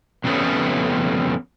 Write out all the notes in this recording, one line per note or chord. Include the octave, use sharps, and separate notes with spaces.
F2 C#3 G3 A3 B3 C#4